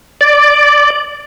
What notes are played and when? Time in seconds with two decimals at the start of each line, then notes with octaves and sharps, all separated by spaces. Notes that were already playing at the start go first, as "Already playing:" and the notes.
0.21 D5